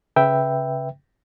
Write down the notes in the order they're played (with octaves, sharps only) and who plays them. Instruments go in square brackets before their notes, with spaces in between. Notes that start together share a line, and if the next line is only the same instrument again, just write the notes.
[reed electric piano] C#3 B4 E5 G5